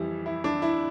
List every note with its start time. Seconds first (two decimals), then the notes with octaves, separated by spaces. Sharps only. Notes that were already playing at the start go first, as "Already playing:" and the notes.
Already playing: F2 E3 G3
0.26 E4
0.44 D4
0.62 E4